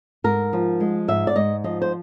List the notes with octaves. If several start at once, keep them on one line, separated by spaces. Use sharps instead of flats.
G#2 A#4
F3
G#3
G#2 E5
D5
G#2 D#5
F3 D#5
C5